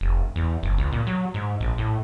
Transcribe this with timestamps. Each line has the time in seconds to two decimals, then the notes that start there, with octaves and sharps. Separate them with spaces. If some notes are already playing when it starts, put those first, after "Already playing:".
0.01 F1
0.36 E2
0.63 F#1
0.78 C#2
0.92 A#2
1.07 F#3
1.34 G#2
1.61 A#1
1.78 A2